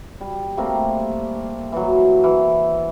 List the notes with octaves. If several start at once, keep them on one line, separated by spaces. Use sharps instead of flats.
G3
G3 A3 A#3 C4
E3 F#3
E3